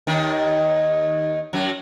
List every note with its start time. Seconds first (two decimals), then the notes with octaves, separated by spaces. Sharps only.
0.07 D#2 D#3
1.53 F#2 F#3